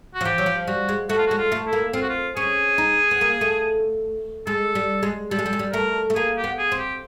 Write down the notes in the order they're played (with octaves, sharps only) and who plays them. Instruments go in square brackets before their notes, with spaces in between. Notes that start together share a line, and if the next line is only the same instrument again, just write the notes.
[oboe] F#4
[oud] F3
[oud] E3 [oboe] G4
[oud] F#3
F3
[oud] G3 [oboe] F#4
[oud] G#3
[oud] A3 [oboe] F#4
[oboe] F4
F#4
[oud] G#3
[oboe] F4
[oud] A3
[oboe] E4
[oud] A#3
[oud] C4 [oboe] F4
[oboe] F#4
F4
[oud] C#4 [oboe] G#4
[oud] D#4
B3
A#3
A3
[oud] G#3 [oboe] A4
[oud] G3
G#3
[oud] G3 [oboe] A4
[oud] G#3
G3
G#3
G3
[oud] A3 [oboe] A#4
[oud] A3
[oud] A#3 [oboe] G#4
[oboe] G4
[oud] B3
[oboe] G#4
[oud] C4
[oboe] G4